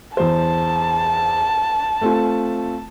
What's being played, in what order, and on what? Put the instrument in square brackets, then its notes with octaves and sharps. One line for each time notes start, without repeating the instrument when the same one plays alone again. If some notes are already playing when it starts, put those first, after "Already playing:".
[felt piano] E2 C5 [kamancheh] A5
[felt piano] A3 C4 F4